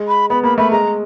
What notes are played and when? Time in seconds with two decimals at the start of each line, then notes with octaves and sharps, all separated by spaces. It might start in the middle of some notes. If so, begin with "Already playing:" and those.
Already playing: G#3
0.08 B5
0.30 B3 B5
0.43 A#3 B5
0.58 A3 B5
0.71 G#3 A#5